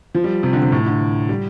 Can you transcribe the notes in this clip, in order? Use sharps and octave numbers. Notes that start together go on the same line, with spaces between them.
F3
G3
C3
D3
C3
A2
D3
G3